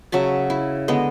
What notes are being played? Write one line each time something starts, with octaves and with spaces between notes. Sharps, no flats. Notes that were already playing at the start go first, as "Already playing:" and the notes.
C#3 F#3 E5 A5
E4
D3 G#3 B3 D#5